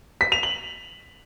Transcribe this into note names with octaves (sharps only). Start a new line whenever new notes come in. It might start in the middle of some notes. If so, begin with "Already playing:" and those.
B6
F7
F#7